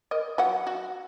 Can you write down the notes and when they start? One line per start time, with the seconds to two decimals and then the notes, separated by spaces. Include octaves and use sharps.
0.11 A#4 D#5
0.38 F#3 F4 F#5
0.67 F#4